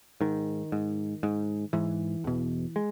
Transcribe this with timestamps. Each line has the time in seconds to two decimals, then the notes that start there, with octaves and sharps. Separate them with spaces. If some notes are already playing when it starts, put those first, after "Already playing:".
0.21 G#2 D#3
0.72 G#2
1.23 G#2
1.73 G#2 E3
2.24 E2 B2
2.76 G#3